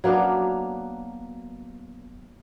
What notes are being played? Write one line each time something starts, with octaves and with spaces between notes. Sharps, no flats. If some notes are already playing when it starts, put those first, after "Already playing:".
F#3 A#3 B3 D4